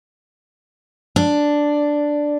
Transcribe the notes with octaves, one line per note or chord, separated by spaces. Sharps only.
D4